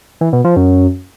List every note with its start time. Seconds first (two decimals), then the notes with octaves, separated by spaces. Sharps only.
0.21 E3
0.33 B2
0.45 F3
0.56 F#2